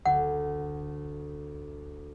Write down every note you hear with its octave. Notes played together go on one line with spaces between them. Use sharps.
D2 F#5